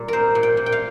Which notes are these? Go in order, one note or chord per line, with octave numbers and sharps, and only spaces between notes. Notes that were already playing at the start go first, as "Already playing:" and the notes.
Already playing: A#2 G3
C4 A#4 C5
A#2
G5
A#2
G5
F5